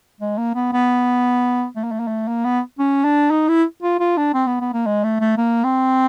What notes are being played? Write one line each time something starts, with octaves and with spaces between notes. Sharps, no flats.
G#3
A#3
B3
B3
A3
A#3
A3
A#3
A3
A#3
B3
C#4
D4
D#4
E4
F4
F4
D4
C4
B3
B3
A#3
G#3
A3
A3
A#3
C4